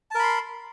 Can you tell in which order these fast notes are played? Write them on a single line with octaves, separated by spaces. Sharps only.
A5 A#4 B5 C6